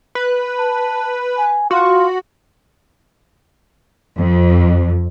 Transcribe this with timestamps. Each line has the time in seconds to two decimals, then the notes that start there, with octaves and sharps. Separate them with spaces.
0.15 B4
0.59 A5
1.38 G#5
1.71 F4 F#4
4.18 F2